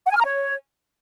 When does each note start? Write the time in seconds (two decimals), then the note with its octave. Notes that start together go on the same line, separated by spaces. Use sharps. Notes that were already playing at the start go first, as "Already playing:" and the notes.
0.05 F#5
0.10 G#5
0.15 F6
0.20 A#5
0.25 C#5